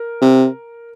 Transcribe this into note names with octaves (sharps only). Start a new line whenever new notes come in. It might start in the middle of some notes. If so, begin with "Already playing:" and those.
Already playing: A#4
C3